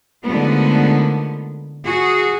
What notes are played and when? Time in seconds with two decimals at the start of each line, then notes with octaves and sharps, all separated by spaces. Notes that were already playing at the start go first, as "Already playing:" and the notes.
0.24 D3 D#3 F3 G#3 A3 B3
1.85 F#4 G#4